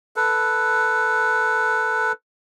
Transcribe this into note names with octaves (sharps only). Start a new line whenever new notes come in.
A4 B4